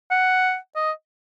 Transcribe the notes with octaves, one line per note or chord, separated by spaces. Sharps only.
F#5
D#5